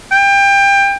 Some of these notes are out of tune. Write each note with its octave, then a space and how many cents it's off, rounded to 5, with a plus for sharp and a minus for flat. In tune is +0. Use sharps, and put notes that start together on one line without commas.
G5 +25